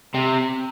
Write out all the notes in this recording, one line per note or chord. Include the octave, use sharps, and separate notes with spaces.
C3